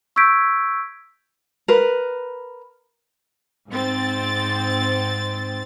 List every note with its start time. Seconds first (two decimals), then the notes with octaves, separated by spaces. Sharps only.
0.16 C#6 E6 G6 G#6 B6 D7
1.68 A#4 B4
3.71 G#2 C4 A6